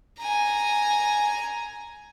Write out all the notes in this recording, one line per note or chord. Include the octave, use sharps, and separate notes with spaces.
G#5 A#5